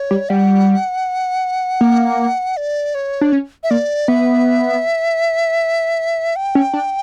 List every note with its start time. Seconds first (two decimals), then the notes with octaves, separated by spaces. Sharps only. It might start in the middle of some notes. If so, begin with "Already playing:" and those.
Already playing: C#5
0.11 G3
0.29 G3 F#5
1.81 A#3
2.57 D5
2.95 C#5
3.21 D4
3.32 C#4
3.63 E5
3.71 A#3 D5
4.08 B3 E5
6.36 G5
6.55 C#4
6.73 D4